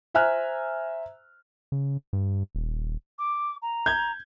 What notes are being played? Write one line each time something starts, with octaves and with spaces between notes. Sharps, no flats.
C5 E5 G#5 A#5 F6 F#6
C#3
G2
D#1
D6
A#5
G6 G#6